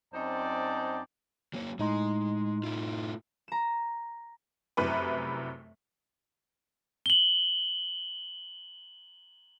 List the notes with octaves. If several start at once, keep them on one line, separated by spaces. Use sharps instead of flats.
F#2 C4 D#4 C5 D5 A5
F#3 A#3 C#5
A2 G#3 D#4 C6
A3 E4 F4
A#5 E7
F1 F#2 C3 E4 B4
F#7 G7